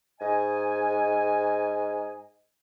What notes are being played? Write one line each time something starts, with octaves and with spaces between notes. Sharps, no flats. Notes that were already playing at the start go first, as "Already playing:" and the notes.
G#2 D#5 G#5